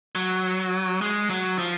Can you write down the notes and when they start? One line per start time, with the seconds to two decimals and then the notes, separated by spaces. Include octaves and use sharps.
0.15 F#3
1.01 G#3
1.30 F#3
1.58 F3